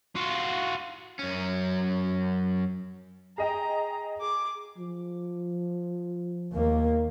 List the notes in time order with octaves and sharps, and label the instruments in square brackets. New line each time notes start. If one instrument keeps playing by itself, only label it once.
[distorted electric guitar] F4 F#4
[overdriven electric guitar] F#2 C#4
[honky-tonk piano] G#4 D#5 G5 [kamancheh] A#5
[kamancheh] G#4 D6
[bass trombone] F3
[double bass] D#2 A#3